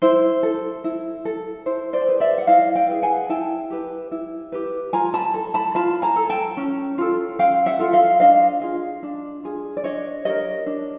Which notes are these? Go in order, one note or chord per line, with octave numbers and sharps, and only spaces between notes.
E4 C5
A4
E4
A4
E4 C5
C5 D5
G#4 B4
D5 E5
F#5
E4 D#5 F5
F5 G5
G#4 B4
F#5 G#5
E4 G5 A5
G4 B4
E4
G4 B4
F4 G#5 A#5
A5 B5
A4
A5 B5
F4 A5 B5
G#5 A#5
A4
G5 A5
C#4
F4 A4
C#4 F5 G5
E5 F#5
F4 A4
D#5 F5
D4 D#5 F5
F4 G#4
D4
F4 G#4
D5
D4 C#5 D#5
G4 A#4 C#5 D#5
D4